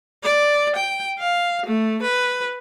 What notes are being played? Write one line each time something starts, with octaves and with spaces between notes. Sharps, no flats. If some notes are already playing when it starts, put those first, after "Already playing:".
D5
G5
F5
A3
B4